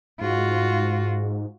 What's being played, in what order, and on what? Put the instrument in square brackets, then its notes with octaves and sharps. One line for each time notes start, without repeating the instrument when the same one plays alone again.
[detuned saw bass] G#2 [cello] F4 F#4